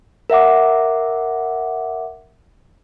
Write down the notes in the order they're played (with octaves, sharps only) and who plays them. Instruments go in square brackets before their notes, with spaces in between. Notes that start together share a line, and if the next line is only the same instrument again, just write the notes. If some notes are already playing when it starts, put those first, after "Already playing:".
[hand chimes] A#4 E5 F#5 D6